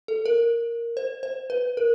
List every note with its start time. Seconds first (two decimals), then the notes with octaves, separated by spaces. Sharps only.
0.08 A4
0.26 A#4
0.97 C5
1.23 C5
1.50 B4
1.77 A#4